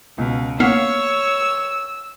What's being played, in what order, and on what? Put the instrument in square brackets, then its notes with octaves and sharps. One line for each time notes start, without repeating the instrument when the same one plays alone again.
[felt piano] C#2 [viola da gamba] B2
[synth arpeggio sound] A#3 B3 [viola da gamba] C#5 [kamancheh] E6 [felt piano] F6 B6 C7